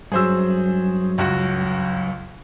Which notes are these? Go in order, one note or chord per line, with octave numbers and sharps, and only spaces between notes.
G2 F#3 G#4 C5 E6
C#2 F#2 F#4